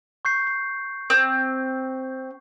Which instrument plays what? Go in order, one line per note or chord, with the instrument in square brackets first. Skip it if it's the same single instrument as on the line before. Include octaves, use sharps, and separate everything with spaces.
[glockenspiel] C#6 G6 C7
C7
[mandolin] C4